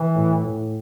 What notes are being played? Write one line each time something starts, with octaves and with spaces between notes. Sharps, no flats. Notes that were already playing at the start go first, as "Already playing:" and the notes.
Already playing: E3
A2
A2